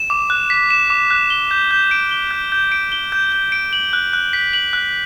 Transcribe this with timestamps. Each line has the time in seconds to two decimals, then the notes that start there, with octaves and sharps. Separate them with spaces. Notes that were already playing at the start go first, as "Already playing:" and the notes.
Already playing: E7
0.10 D6
0.30 F#6
0.50 B6
0.70 E7
0.90 D6
1.10 F#6
1.30 G7
1.51 G6
1.71 G6
1.91 D7
2.11 G7
2.31 G6
2.52 G6
2.72 D7
2.92 G7
3.12 G6
3.32 G6
3.52 D7
3.73 F#7
3.93 F#6
4.13 F#6
4.33 B6
4.53 F#7
4.73 F#6